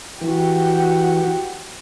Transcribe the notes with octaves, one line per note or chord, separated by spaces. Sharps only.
E3 F#4 G4